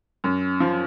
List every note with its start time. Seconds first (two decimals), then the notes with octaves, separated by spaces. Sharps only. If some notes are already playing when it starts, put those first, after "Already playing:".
0.24 F#2
0.60 F3